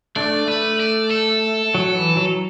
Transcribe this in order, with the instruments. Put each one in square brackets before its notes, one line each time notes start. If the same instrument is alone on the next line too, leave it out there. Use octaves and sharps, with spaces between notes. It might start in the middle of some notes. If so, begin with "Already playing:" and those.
[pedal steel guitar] A3 D4 [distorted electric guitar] D5
[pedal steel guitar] A3 [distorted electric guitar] B4
[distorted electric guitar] D5
A4
[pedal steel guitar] F#3
E3
F#3